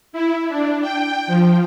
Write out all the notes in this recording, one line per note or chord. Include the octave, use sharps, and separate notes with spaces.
E4
D4
G5
F3